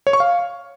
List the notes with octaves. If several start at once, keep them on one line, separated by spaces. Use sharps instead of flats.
C#5
C#6
F5